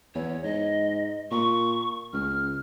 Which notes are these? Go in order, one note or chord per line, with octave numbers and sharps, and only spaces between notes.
E2 C#5
G#2 D#5
A#2 C#6
C#2 F6